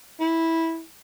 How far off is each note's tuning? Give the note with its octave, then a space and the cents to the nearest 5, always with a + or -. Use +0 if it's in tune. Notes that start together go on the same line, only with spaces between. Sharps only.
E4 -10